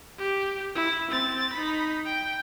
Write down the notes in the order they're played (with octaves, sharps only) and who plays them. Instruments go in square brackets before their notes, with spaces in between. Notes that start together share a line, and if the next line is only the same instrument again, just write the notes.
[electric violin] G4
E4
C4 A6
D#4 B5
G5